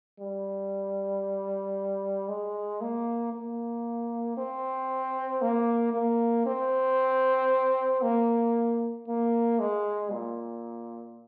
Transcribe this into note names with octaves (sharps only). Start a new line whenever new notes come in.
G3
G#3
A#3
A#3
C4
A#3
A#3
C4
A#3
A#3
G#3
A#2